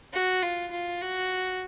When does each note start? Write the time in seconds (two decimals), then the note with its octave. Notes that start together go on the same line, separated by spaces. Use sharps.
0.13 F#4
0.43 F4
0.72 F4
1.02 F#4